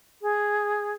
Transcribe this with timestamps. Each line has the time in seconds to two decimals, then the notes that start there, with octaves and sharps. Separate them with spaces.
0.22 G#4